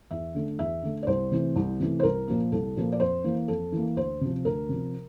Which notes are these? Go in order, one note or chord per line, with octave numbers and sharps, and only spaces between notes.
E2 E5
D3 A3
E2 E5
D3 A3
D5
C2 C5
C3 E3 A3
C2
C3 E3 A3
C5
C2 A#4
A#2 F3 A#3
C2 A4
A#2 F3 A#3
D5
F2 C5
E3 A#3
F2 A4
E3 A#3
D2 C5
C3 F3
D2 A#4
C3 F3